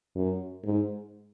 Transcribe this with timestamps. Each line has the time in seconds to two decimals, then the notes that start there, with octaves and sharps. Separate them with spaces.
0.15 F#2
0.64 G#2